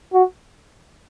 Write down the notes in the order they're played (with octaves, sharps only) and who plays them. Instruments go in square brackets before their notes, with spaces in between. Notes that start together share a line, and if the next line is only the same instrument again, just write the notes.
[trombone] F#4